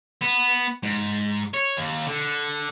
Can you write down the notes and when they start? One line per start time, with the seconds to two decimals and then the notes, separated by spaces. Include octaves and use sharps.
0.21 B3
0.83 G#2
1.54 C#5
1.77 D#2
2.07 D3